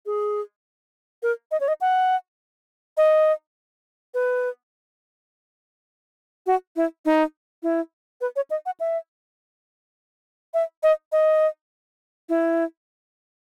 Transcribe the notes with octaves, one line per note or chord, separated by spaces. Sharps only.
G#4
A#4
D#5
C#5
D#5
F#5
D#5
B4
F#4
E4
D#4
E4
B4
C#5
D#5
F#5
E5
E5
D#5
D#5
E4